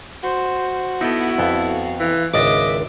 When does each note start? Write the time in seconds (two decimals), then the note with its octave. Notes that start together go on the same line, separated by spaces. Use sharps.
0.24 F#4 C5
1.01 B3 D#4 E4 A4
1.38 F2 B3 A4 F5
2.00 E3
2.34 G#1 C#2 D4 D#5 E5 D6